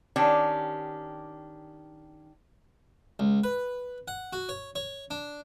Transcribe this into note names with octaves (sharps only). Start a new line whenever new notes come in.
D#3 C#4 D4 G4
C#2
B4
F#5
F#4
C#5
C#5
D4